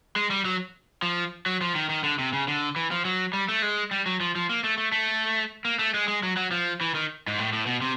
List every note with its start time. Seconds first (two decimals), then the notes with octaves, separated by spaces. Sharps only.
0.16 G#3
0.31 G3
0.45 F#3
1.02 F3
1.46 F#3
1.61 F3
1.75 D#3
1.89 D#3
2.03 D3
2.19 C3
2.33 C#3
2.48 D3
2.76 E3
2.91 F3
3.05 F#3
3.33 G3
3.49 A3
3.62 G#3
3.91 G3
4.06 F#3
4.20 F3
4.36 F3
4.49 A#3
4.64 A3
4.78 A3
4.92 A3
5.65 A#3
5.79 A3
5.94 G#3
6.08 G#3
6.23 F#3
6.37 F#3
6.51 F3
6.81 E3
6.95 D#3
7.27 G#2
7.39 A2
7.53 A2
7.66 B2
7.82 C3